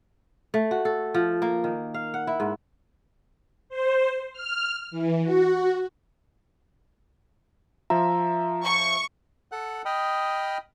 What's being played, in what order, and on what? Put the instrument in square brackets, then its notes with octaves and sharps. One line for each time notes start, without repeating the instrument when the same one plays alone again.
[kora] A3
F#4
A4
F3
A#3
D#3
F5
F#5
E4
G#2
[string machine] C5
F6
E3
F#4
[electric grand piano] F3 E5 [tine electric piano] F4 [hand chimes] A#5
[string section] C#6
[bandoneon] A4 F#5 F#6
D#5 G5 B5 D#6 F6